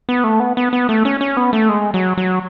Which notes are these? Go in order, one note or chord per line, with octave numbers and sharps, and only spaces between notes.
B3
A3
B3
B3
B3
A3
C#4
C#4
B3
A3
G#3
F#3
F#3